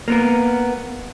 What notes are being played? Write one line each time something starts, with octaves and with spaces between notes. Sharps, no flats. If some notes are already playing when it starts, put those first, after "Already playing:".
A#3 B3 A#4